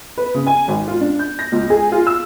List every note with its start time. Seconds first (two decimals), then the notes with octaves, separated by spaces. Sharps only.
0.17 B4
0.34 C#3
0.46 G#5
0.68 G#1
0.88 F4
1.01 D4
1.19 G6
1.39 A#6
1.52 C#2
1.70 G#4
1.92 F4
2.07 E6